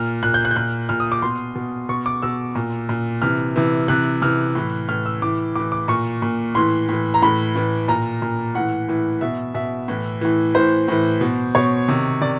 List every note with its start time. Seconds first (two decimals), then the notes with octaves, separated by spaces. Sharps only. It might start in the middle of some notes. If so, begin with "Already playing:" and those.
Already playing: A#2 F6
0.23 A#2 F#6
0.34 G6
0.45 F#6
0.51 G6
0.56 A#2 F#6
0.89 A#2 F6
1.00 D#6
1.12 D6
1.22 B2 C6
1.55 B2
1.89 B2 C#6
2.06 D6
2.22 B2 E6
2.55 A#2
2.89 A#2
3.22 C3 E3 F6
3.56 C3 E3
3.88 C3 E3 F#6
4.22 C3 E3 F6
4.55 A2 E3
4.88 A2 E3 F6
5.06 E6
5.22 A2 E3 D6
5.56 A2 E3 D6
5.72 D6
5.88 A#2 C#6
6.22 A#2
6.55 A2 E3 C6
6.89 A2 E3
7.14 A#5
7.22 A2 E3 B5
7.55 A2 E3
7.88 A#2 A#5
8.22 A#2
8.55 A2 E3 F#5
8.88 A2 E3
9.21 B2 E5
9.54 B2 E5
9.88 A2 E3
10.21 A2 E3
10.55 A2 E3 C5
10.88 A2 E3
11.21 B2
11.55 B2 C#5
11.88 C3 D#3
12.21 C3 D#3 D5